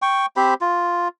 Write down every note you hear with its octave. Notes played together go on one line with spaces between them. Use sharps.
G5 C#6
C4 G4 C5 B5
F4